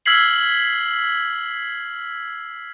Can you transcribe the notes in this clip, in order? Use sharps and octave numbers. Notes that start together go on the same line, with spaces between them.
E6 F6 G#6 B6 C7 F#7